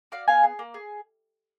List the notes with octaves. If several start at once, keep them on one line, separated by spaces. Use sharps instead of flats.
F#4 D5 F5
B3 F5 G#5
G#4
A#3
G#4